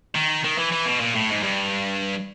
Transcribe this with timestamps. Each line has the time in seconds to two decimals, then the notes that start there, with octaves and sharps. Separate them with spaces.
0.15 D#3
0.45 D#3
0.58 E3
0.72 E3
0.86 B2
1.00 A#2
1.15 A2
1.29 G#2
1.43 G2